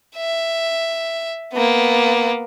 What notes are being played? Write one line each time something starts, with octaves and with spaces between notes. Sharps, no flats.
E5
A#3 B3